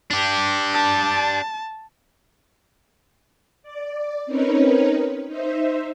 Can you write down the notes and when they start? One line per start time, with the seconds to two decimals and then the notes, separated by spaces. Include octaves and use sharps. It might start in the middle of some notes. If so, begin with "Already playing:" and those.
0.10 D4 G4
0.73 A5
3.63 D5
4.26 C4 C#4 D#4 A#4 B4 C#5
5.28 D#4 C5 E5